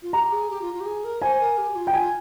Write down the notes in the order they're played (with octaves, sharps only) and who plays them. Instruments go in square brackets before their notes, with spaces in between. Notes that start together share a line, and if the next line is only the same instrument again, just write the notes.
[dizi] F4
[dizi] G4 [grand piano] A#5
[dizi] G#4
G4
F4
F4
G4
G#4
A#4
[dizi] C5 [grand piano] G#5
[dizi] A#4
G4
G4
F4
[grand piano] G5
[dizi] F4 [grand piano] G#5